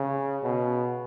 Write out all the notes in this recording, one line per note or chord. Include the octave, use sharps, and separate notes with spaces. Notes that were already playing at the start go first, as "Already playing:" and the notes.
Already playing: C#3
B2